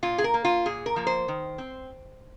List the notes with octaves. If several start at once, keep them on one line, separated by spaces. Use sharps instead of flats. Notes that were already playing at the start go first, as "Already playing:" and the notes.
A#2 F4
G#4
A#4
A#3
F4
A#2 G#4
A#4
F3 A#3
C5
D#3
C4